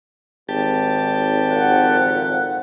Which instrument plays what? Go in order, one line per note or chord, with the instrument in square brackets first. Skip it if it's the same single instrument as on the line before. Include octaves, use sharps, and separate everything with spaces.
[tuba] G#1 [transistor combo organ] G4 A5
[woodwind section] F2 A#2 F#5